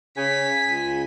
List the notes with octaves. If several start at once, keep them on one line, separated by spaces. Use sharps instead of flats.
C#3 G#5 B6
C#2